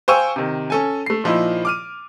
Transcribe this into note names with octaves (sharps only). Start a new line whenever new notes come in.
C5 F5 G5 G#5 C#6 E6
C3 D#3
C#4 A4 G#5
A3 C7
A#2 F3 D#4 E4
D6 F6 D#7